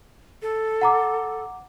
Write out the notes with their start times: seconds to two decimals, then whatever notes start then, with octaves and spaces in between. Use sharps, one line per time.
0.42 A4
0.81 F#5 A#5 D6